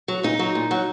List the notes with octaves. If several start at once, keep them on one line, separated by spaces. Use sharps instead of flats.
F#3
A#2 D#4
F#3
A#2
F#3